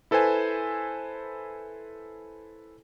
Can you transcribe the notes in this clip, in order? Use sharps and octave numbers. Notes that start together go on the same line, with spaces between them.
E4 A4 B4 C5 G#5